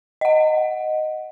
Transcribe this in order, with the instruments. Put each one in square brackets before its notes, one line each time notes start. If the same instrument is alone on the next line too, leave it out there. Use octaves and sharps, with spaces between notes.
[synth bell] D#5 F#5